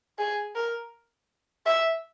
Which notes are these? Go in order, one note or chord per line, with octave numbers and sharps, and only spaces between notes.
G#4
A#4
E5